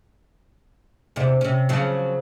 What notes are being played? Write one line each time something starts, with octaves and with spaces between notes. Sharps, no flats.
E2 C3 D4
C3 C#4
C#3 F3 F#3